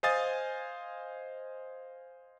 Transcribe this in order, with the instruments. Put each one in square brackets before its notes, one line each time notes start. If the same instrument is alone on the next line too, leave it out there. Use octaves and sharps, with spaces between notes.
[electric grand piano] C5 D#5 F5 G#5 D#6 A6